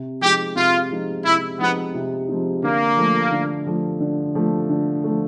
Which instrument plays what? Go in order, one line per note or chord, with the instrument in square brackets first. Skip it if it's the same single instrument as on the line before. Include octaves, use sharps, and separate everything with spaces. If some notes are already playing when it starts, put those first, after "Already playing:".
Already playing: [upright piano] C3
[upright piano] F3 G#3 C4 D#4 [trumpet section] G4
[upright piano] C3 [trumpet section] F4
[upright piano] F3 G#3 C4 D#4
[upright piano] C3 [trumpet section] E4
[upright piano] F3 G#3 C4 D#4 [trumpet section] B3
[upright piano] C3
F3 G#3 C4 D#4
[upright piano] D3 [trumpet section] A#3
[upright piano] F3 A3
D3
F3 A3
D3
F3 A3
D3
F3 A3